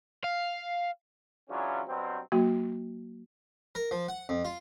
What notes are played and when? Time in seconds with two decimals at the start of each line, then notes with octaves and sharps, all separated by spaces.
0.24 F5
1.49 C#3 E3 F#3 C#4 D4 F4
1.87 G2 B2 F#3 C4
2.32 F#3 A#3 F#4
3.75 A#4
3.91 F3
4.08 F#5
4.29 F2
4.45 F4